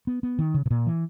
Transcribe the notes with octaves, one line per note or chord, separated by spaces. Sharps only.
B3
B3
D#3
C#3
B2
A#2
E3